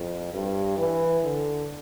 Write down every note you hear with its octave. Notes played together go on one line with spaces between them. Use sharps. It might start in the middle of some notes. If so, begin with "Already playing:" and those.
Already playing: F2
G2
E3
D3